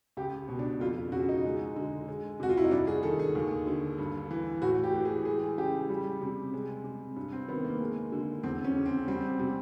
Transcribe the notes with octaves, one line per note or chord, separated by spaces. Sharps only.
C#2 G4
B2
D4
F2 F4
C#3 F#4
D#4
G#3
D3
G#3
C3 F#4
F4
E4
D#4
G2 D4
G#4
D#3 A4
G#4
D#2
D3
G2
E3
A2 F#4
G4
E3
G#4
G#3 G#4
C#3 G4
G3
C3
G#3
C3
G2
C4
D#3 B3
A#3
G#3
D3
E2 C4
C#4
C#3
C4
G3 C4
C3